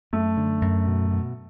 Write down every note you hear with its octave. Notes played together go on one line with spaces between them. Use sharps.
F#2 A3
D3
F#2
B2
B2